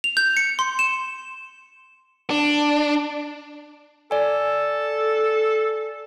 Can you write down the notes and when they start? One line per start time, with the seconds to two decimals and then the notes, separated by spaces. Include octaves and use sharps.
0.04 F7
0.17 G6
0.37 C#7
0.59 C6
0.79 E7
2.30 D4
4.11 A4 D5 G#5